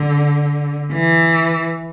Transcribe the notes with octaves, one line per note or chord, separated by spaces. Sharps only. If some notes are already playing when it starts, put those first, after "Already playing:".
Already playing: D3
E3